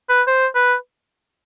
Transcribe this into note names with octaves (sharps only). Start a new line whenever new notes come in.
B4
C5
B4